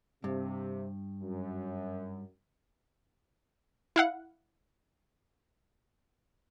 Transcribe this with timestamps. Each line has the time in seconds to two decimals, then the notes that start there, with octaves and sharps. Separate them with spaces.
0.24 G2 C3
1.21 F#2
3.96 E4 F5 F#5